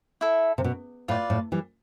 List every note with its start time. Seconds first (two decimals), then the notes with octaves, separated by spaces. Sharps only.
0.21 E4 A4 E5
0.58 C3
0.64 B2
1.08 A2 F4 B4 D5
1.30 A2
1.52 E3 G3